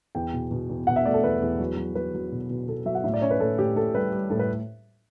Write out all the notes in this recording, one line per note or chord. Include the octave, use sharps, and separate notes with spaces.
E2 G5
B2
B2
E2
B2 F#5
E5
A3 D5
A4
E2 B4
E2
F#3
F#3
F#3 B4
F#3
B2
B2
B2 A4
F#3 E5
F#5
A2 E5
D5
C#4 C#5
B4
A2 A4
A2 G4
A2 A4
G3 B4
G3
A2 A4
B4